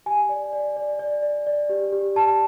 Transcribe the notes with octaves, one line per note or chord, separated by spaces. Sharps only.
G4 G#5
D5
D5
D5
D5
D5
D5
G4
G4
G4 A5